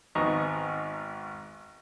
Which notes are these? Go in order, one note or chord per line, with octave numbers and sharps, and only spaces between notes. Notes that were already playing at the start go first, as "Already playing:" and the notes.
G#1 G#2 B3 D#5 A#5 C#6